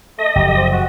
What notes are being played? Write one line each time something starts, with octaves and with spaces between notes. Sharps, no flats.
A3 D#5
F#1 F3 G4
C4
F#4